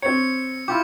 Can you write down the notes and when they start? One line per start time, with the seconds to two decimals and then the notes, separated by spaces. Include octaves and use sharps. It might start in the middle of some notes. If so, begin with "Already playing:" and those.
0.02 C4 C#5 C#7
0.68 E4 F4 G4 D6